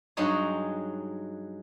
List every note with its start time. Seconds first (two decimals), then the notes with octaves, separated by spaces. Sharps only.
0.17 G2 F#3 G#3 D#4 C#5